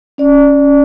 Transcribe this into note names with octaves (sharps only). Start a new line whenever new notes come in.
C#4 D5